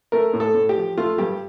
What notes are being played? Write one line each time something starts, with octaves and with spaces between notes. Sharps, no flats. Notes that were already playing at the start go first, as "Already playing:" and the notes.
A3 A#4
A2
A4
A2
G4
F3
A3 F4
G2 G4